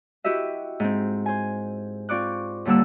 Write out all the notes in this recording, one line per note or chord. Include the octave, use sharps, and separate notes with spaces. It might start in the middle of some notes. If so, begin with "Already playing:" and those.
E4 F#4 G4 D#5 E5
G#2 C4
C5 G#5
C4 F4 D5 C#6 D6 F#6
D#2 D3 G3 A#3 F#5 E6